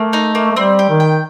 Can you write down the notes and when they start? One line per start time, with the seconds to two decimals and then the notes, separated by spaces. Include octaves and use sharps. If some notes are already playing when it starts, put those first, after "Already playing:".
Already playing: A3 A#3
0.13 D#4
0.35 A#3
0.52 A3
0.56 G3 C4
0.79 G4
0.89 D#3
1.00 G5